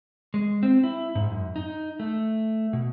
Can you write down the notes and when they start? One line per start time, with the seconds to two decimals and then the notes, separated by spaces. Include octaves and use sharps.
0.34 G#3
0.63 C4
0.84 E4
1.15 G#2
1.30 F#2
1.56 D#4
2.00 A3
2.73 B2